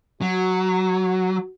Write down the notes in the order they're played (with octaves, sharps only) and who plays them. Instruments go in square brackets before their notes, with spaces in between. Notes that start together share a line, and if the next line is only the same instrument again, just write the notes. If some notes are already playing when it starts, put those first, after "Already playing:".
[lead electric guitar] F#3 [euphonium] F#4